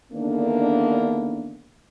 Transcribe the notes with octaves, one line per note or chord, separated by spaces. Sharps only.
E2 D3 D#3 A#3 B3 D4